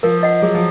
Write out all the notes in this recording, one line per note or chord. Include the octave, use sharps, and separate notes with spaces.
F3 A#4
D#5 F#5
F#3 G#4
F3